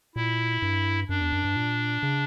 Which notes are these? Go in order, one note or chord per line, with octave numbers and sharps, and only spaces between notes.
A#2 E4
G2
F#2 D4
E2
F#2
G2
A#2
C#3